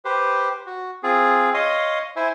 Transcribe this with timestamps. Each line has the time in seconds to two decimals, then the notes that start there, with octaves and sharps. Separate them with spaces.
0.05 G4 B4 C5
0.66 F#4
1.03 C4 F4 G#4
1.54 C#5 D#5 F5 C6 D#6
2.16 E4 C5 E5 G#5